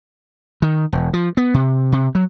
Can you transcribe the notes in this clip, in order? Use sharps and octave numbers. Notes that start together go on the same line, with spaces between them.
D#3
E1
F3
B3
C3
C3
F#3